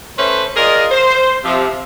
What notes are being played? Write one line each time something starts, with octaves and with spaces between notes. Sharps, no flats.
A3 C#4 B4 C5
F4 G#4 A#4 D5 D#5
C5
C3 F3